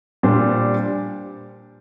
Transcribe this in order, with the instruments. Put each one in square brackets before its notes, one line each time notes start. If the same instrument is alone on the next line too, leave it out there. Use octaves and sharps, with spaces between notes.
[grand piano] A#2 G3 D4 G4 C5